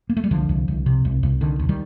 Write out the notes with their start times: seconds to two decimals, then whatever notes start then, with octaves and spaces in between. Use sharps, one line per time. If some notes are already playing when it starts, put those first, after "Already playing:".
0.09 A#3
0.17 A3
0.24 G3
0.31 C2 D3 F3
0.49 C2
0.68 C2
0.86 C3
1.05 C2
1.23 C2
1.41 D3 D#3
1.59 D2
1.69 D#3 G3